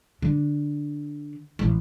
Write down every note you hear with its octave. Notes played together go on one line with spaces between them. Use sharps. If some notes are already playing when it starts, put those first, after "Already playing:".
D3
A1